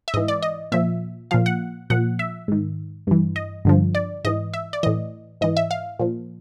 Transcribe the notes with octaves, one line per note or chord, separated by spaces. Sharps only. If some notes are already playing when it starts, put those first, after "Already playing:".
E5
G#2 E3 D#5
D5
D#5
A#2 F3 E5
A#2 F3 F5
F#5
A#2 F3 F#5
E5
G#2 D#3
G2 E3
D#5
G2 D3 F3
D5
G#2 E3 D#5
E5
D5
A2 E3 D#5
G#2 E3 D#5
E5
F5
A#2 F3